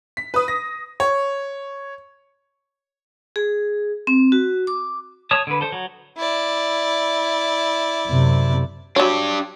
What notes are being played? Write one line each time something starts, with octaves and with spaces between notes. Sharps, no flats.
B6
B4 D#6
A#6
C#5
G#4
C4
F#4
D6
C#5 A5 D#6
D3 B4
A4 C5
F#3
E4 D5
F#2 C3
F#3 D4 G4 C#5